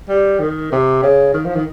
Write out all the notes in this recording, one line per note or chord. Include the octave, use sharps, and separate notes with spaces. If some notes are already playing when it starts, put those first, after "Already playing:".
G3
D#3
C3
C#3
D#3
F3
D#3